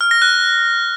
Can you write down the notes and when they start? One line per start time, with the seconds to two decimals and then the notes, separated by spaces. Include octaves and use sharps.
0.01 F6
0.11 A#6
0.22 F#6